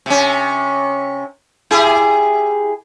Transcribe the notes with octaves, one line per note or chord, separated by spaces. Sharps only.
C3 C#4
E4 G4 G#4